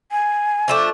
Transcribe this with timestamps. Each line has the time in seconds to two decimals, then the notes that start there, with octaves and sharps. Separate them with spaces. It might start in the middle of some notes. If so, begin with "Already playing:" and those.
0.11 G#5
0.68 F3 A3 D4